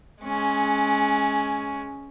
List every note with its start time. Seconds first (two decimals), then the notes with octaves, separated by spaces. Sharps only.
0.22 G#3 C#4